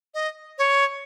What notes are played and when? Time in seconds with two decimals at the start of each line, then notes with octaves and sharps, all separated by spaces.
0.14 D#5
0.58 C#5